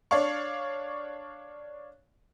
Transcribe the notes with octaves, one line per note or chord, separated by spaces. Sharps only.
D4 C#5 D5 F5 C#6